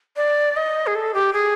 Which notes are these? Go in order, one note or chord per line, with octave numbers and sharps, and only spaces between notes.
D5
D#5
G#4
A4
G4
G#4